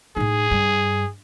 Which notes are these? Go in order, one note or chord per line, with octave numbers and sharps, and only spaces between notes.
A2 D#4 G#4
G2